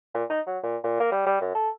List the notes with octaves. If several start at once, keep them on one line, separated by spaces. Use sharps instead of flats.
A#2
D#4
F#3
A#2
A#2
A#3
G3
G3
F#2
A4